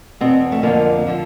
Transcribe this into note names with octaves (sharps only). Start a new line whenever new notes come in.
E2 B2 C4
A3
F2 D3 F3 A#3
D3 F3